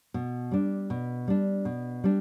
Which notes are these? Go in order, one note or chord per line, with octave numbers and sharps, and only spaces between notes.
B2
G3 D4
B2
G3 D4
B2
G3 D4